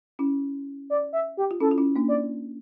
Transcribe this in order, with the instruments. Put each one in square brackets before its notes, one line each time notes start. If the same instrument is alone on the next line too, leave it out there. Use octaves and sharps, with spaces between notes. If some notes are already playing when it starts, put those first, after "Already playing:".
[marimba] C#4 E4
[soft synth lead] D5
E5
G4
[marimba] F4
[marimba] C#4 E4 [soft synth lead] A4
[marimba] F4
C#4 E4
A#3 D4
[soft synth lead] D5